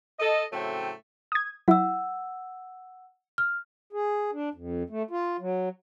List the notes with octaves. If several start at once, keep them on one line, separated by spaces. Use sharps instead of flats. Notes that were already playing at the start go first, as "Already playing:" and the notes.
A4 D#5
A2 C#3 F#3 A3 C4 G5
D#6 G#6
F#3 E4 F#5 E6
F6
G#4
D4
F2
A3
F4
F#3